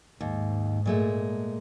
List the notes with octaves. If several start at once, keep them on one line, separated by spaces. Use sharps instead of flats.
D#2 G#2
A#2 G#3 A3